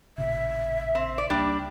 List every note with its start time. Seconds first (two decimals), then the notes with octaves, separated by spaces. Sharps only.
0.18 A1 A#2 C#3 E5
0.95 C4
1.18 D5
1.30 C#2 G3 A#3 D4